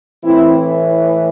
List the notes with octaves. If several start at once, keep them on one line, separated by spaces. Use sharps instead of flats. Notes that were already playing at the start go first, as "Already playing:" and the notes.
A2 E3 C4 E4